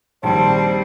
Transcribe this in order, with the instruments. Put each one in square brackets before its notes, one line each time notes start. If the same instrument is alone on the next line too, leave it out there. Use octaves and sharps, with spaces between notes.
[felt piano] A#1 D#3 [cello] G3 C4 [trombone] C5 [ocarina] A5